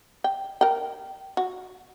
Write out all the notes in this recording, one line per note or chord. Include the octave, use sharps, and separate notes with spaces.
G5
A#4 G5
F#4